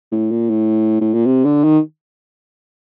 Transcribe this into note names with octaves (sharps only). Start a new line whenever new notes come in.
A2
A#2
A2
A2
A#2
C3
D3
D#3